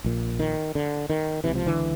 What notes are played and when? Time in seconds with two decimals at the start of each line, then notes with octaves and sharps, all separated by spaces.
0.04 A#1 A#2
0.40 D#3
0.75 D3
1.10 D#3
1.44 C#2 C3 E3
1.55 F3
1.67 D3 E3